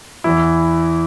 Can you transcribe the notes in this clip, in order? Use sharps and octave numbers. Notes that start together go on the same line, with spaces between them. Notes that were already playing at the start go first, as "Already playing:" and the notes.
E2 E3 E4